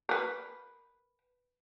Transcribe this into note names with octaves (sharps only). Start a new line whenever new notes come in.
A#4 B4